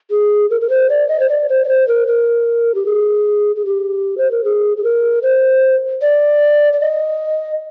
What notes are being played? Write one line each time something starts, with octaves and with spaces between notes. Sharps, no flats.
G#4
A#4
A#4
C5
D5
D#5
C5
D5
C5
D5
C5
A#4
A#4
G4
G#4
G#4
G4
C5
A#4
G#4
G#4
A#4
C5
D5
D5
D#5